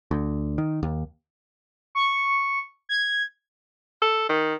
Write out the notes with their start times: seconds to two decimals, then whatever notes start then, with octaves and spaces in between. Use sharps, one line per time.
0.11 D2
0.58 D#3
0.83 D#2
1.95 C#6
2.89 G#6
4.02 A4
4.29 D#3